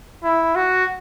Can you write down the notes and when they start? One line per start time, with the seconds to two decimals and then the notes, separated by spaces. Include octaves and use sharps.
0.24 E4
0.55 F#4